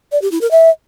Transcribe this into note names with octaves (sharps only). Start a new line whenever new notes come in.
D5
G4
E4
A#4
E5